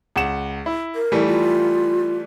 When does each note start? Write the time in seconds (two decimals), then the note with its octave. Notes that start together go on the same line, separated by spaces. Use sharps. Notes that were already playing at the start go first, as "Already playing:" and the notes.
0.16 C#2 F#5 E7
0.66 E4
0.95 A#4
1.12 E3 G3 A3
1.26 F4